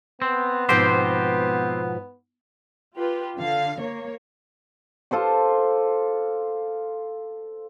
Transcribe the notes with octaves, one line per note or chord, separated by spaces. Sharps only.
B3 C4
G#2 B2 F3 C4 G4 C5
F4 G4 B4
D3 F5
A#3 C#5
F4 A4 C5 D6